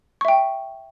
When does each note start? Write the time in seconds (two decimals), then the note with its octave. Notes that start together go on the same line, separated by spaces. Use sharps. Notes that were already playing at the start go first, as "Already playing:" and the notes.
0.21 C#6
0.25 E5
0.28 G5